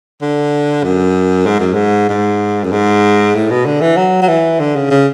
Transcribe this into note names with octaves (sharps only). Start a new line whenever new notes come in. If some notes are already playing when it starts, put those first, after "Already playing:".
D3
F#2
G#2
F#2
G#2
G#2
F#2
G#2
A2
B2
D3
E3
F#3
F#3
E3
D3
C#3
C#3